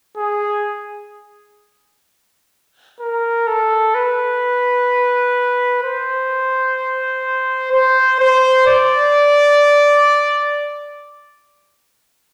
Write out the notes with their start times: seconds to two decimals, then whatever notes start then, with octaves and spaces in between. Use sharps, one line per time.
0.17 G#4
3.00 A#4
3.47 A4
3.95 B4
5.83 C5
7.72 C5
8.19 C5
8.67 D5